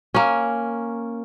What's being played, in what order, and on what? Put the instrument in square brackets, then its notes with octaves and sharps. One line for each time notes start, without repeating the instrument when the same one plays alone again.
[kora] A#3 C#4